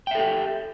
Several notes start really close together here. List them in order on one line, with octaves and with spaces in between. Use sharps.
G5 E5 A4 G4